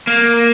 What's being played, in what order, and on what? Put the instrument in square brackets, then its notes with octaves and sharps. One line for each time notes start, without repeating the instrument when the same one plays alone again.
[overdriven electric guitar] A#3